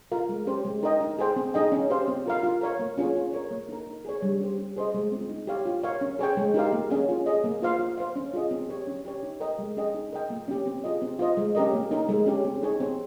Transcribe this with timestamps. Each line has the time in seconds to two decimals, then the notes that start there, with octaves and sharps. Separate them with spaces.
0.12 F4 A#4 F5
0.29 G#3
0.47 C#4 G4 C5
0.65 G#3
0.83 D#4 A#4 D#5 G5
1.01 D#4
1.19 G#4 C5 G5
1.36 C4
1.54 D#4 G#4 D#5 G5
1.72 C#4
1.90 G4 C5 F5
2.08 C4
2.26 F4 A#4 F5
2.43 F4
2.61 A#4 C#5 F5
2.79 A#3
2.97 C#4 F4 G#4 C#5
3.15 F4
3.33 A#4 C#5
3.51 A#3
3.69 D#4 A#4
3.87 D#4
4.05 G#4 C#5
4.22 G3
4.40 C#4 G4 C5
4.58 C#4
4.76 G#4 C5 D#5
4.94 G#3
5.12 C4 F4
5.29 D#4
5.47 G4 C#5 F5
5.65 F4
5.83 A#4 C#5 F5
6.01 C#4
6.19 G#4 C#5 G5
6.37 G#3
6.54 D#4 G4 A#4 F5
6.72 A#3
6.90 C#4 G#4
7.09 F4
7.26 G#4 D#5
7.44 A#3
7.62 F4 C5 F5
7.79 F4
7.98 C5 F5
8.16 C#4
8.34 F4 G#4 D#5
8.51 C4
8.69 G4 C#5
8.87 C#4
9.05 G4 C#5
9.23 D#4
9.40 A#4 D#5 G5
9.59 G#3
9.77 C#4 G#4 D#5 G5
9.94 D#4
10.12 A#4 D#5 G5
10.30 A#3
10.48 C#4 G4
10.66 C4
10.84 F4 G#4 D#5
11.02 C4
11.19 F4 C5 D#5
11.37 G#3
11.55 C#4 G4 A#4 D#5
11.73 A#3
11.91 D#4 A#4
12.09 G#3
12.26 C#4 G4
12.45 C4
12.62 D#4 G#4 C#5
12.80 C4